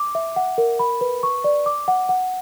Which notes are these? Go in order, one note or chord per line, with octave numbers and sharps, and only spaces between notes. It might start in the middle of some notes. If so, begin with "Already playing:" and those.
Already playing: D6
E5
F#5
A#4
B5
B4
C#6
D5
D6
F#5
F#5